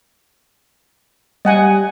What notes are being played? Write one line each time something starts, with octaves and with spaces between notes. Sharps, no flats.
G3 D#5 F#5 G#5